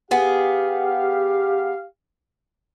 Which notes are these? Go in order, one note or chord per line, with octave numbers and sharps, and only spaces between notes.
B3 G4 G#4 F5